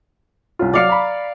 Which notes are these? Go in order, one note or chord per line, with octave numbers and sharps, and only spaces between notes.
C2 C#4 F4
F#3 D5 F5 C#7 F7
A#5 B5